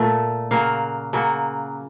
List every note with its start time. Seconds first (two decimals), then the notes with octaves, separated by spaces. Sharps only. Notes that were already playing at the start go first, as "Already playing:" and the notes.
Already playing: A#2 A3
0.51 C#3 F#3 A#3 F5
1.13 C#3 F#3 A#3